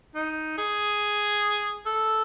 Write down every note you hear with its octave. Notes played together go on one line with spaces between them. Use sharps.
D#4
G#4
A4